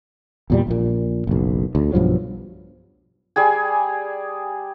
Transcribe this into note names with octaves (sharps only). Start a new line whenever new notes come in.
E2 A#2 G3
A#1 A#2
F#1 B1
D2
B1 G2 F3 F#3
G3 G#4 G#5